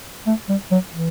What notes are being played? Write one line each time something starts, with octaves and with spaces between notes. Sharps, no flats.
A3
G3
F#3
E3